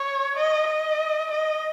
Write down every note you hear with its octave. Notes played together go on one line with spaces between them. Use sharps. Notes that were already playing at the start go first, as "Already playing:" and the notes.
Already playing: C#5
D#5
D#5
D#5